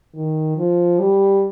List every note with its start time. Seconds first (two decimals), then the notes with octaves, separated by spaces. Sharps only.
0.15 D#3
0.57 F3
0.99 G3